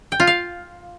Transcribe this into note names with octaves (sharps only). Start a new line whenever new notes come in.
G5
F4
F5